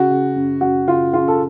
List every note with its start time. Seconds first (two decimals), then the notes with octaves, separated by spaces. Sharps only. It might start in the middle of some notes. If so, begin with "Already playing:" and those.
Already playing: C#3 F#4
0.10 C#3
0.36 F#2
0.61 F#2 F#4
0.87 C#3 F4
1.13 C#3 F4
1.28 A4